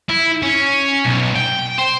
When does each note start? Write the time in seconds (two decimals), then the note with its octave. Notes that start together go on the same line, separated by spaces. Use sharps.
0.09 E4
0.42 C#4
1.05 B1
1.35 G5
1.78 C5